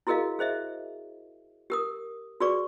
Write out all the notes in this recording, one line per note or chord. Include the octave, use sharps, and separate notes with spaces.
E4 F#4 G#4 A#4 D#5 F5
G#4 C5 D#5 E5
G4 A#4 D#6
F#4 G#4 B4 D5 C#6 D6